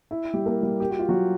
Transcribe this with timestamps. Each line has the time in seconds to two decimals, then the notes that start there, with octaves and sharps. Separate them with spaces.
0.11 E4
0.34 G3 G4
0.46 A#3 A#4
0.63 G3 G4
0.80 G4
0.90 F#4
0.99 F4
1.09 F#3 F#4